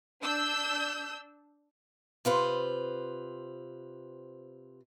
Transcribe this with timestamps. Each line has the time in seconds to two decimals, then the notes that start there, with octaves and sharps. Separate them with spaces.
0.22 D4 E6 G6
2.25 C3 F4 B4 C5